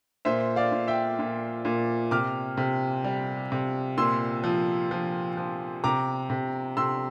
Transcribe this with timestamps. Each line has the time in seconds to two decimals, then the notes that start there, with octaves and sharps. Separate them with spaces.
0.25 A#2 C5 E5
0.56 D5 F5
0.72 A#2
0.88 E5 G5
1.19 A#2
1.65 A#2
2.11 C3 D6 F6
2.57 C3
3.04 G3
3.52 C3
3.97 A#2 C6 E6
4.44 F3
4.91 F3
5.37 F3
5.84 C3 A#5 D6
6.30 C3
6.77 C3 C6 E6